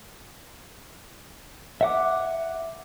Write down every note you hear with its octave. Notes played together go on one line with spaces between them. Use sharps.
E5 F#5 D6